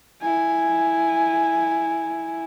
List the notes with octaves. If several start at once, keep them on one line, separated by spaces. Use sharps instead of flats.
E4 G#5